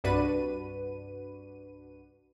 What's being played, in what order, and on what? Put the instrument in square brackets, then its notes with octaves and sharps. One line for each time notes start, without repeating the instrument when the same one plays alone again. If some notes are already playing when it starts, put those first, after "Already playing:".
[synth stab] C2 G2 D4 F#4 B4 D#7